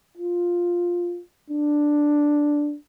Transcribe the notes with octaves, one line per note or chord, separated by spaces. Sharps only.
F4
D4